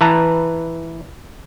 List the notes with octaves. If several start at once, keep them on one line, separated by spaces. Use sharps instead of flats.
E3 B4 A5 A#5